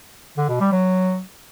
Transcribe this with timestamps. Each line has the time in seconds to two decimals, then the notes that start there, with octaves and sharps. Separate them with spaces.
0.37 D3
0.49 B2
0.61 G3
0.72 F#3